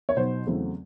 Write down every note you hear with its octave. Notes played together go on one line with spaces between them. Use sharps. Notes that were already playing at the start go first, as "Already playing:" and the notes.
C#5
B2 F#3 B3 D#4 C5
E2 C#3 F#3 A3 C4